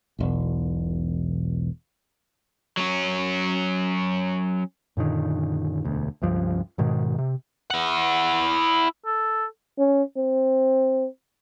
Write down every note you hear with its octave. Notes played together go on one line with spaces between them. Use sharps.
E1 B1
F#3 C#4
F#2 A#2 D3 D#3
E1 D2
C#2 G2 F3
G#2 B2 D#3 G#3
C3
E4 F#5
A4
C#4
C4